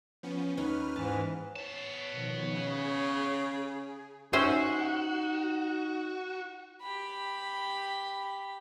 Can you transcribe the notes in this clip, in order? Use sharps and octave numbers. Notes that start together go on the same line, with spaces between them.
F3 B3 C#4
D#2 C#4 D#4 B4 F6
G#2 E3 A5
B3 C#5 A5 C7
B2 D#3 F3
C#3 G#4
C#4 D#4 F#4 C5 E5
G4 B5